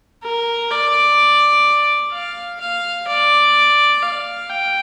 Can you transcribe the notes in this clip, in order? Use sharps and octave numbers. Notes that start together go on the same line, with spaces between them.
A#4
D5
F5
F5
D5
F5
G5